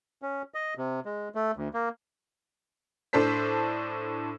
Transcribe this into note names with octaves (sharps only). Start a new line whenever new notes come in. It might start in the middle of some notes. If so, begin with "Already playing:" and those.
C#4
D#5
C3
G#3
A3
D2
A#3
A2 D4 A4 C5 B6